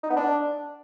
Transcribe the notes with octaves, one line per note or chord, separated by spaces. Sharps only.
D#4
B3
D4